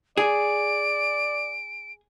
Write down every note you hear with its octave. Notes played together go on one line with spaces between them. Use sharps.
G#4 D5 D7